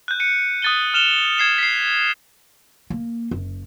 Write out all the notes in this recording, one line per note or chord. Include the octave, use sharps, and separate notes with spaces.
F#6 G6
F#6 C#7 D#7
D#6 F#6 A6 D#7 G7
F6 E7 F7 G7
G#6 C7 E7
B6 C7
A#3
F#1